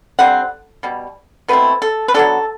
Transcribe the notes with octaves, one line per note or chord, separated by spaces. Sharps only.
D3 G3 C4 F#5
B2 G3
B2 A3 C4 E4 B4
A4
B4
F#3 B3 D4 A4